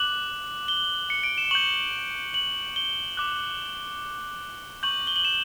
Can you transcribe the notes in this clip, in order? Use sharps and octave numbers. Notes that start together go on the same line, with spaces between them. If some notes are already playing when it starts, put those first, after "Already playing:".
Already playing: D6 F#6 F#7
G7
C#7
D7
E7
C#6 G6 F#7
F#7
G7
D6 F#6
C#6 G6 F#7
G7
F#7
E7